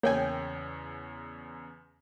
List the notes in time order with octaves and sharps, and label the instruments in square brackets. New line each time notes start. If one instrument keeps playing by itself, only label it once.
[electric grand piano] E2 C#3 [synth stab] A#3 G5 G#5 [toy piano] C#5